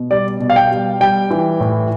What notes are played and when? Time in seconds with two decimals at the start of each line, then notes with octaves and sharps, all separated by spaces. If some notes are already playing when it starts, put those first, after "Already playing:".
Already playing: B2
0.10 G3 D5
0.40 B2
0.50 F5
0.56 G5
0.71 G3
1.00 G3 G5
1.31 E3
1.60 A2